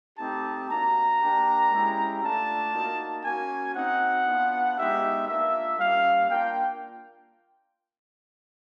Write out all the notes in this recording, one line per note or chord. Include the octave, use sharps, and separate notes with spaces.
A3 C4 D#4 G4 A5
A#3 D4 F#4 A#5
A#3 D4 G4
G#3 C#4 E4 G4
A3 D4 F4 A5
A#3 D#4 F#4
A#3 C#4 F#4 G#5
C4 D#4 F#4 F#5
B3 D4 F4
G#3 B3 D#4 G4 E5
A#3 D4 F4 E5
G3 A#3 C#4 F5
A#3 D4 F4 G5